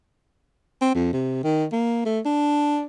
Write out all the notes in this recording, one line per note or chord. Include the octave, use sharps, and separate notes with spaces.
C4
F2
C3
D#3
A#3
A3
D4